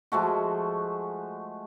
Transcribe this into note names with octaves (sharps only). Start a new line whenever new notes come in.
F3 G#3 A3 F#4